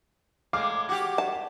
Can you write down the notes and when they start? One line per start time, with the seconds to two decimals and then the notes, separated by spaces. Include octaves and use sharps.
0.53 A2 G#3 F5 D6
0.89 F#4 G4
1.18 A5